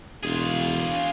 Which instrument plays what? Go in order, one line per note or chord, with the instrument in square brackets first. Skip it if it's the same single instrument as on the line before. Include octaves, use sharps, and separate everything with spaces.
[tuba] E1 [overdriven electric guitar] F4 G#4